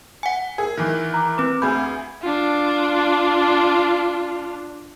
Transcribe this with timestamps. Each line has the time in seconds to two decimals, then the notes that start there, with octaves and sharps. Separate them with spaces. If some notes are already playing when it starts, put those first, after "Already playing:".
0.23 F#5 G#5
0.58 G#4 A#4
0.77 D#3 E3
1.14 A#5 D6
1.38 C4 B4 D6
1.62 D2 G#4 B4 B5 G6
2.22 D4 F4